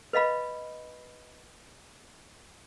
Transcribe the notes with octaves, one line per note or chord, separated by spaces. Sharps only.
B4 D#5 F5 B5